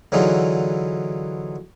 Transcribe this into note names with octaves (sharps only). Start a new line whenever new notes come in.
D3 E3 F#3 D#4 F4 G#4